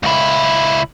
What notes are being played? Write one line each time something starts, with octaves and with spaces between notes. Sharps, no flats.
C#2 E4